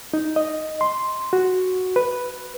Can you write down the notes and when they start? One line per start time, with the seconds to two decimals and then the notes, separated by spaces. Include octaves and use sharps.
0.14 D#4
0.36 D#5
0.81 C6
1.33 F#4
1.96 B4